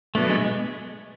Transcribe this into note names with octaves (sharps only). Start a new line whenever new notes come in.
B2 F#3 A3 B3 D4
G#3
G#3